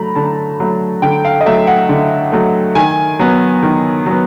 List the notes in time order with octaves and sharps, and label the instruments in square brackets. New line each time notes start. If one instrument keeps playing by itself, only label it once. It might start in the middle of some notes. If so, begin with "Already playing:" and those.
Already playing: [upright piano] D3 F#3 A3 A#5 B5
D3 A5
F#3 A3
D3 G5
F5
D#5
F#3 A3 E5
F#5
D3
F#3 A3
D#3 G#5
F#3 B3
D#3
F#3 B3